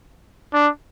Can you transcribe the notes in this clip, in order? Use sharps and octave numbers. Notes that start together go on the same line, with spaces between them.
D4